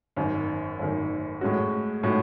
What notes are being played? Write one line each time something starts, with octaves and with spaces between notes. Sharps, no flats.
G#1 F#2 D#3
G#1 F#2 D#3
A2 G#3 C#4 F#4
A2 G#3 C#4 F#4